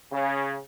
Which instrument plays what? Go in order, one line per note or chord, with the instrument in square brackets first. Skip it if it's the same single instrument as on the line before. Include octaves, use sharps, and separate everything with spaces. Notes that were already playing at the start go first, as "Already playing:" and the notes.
[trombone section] C#3